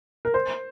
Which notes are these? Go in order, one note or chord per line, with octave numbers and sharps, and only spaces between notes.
A#4
C5